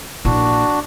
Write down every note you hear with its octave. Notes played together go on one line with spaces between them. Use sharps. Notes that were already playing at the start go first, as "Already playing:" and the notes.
A#1 D4 E4 F#4